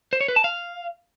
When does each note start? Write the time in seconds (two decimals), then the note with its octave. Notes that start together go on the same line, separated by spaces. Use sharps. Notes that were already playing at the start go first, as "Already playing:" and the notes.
0.13 C5
0.21 C#5
0.28 B4
0.36 A5
0.44 F5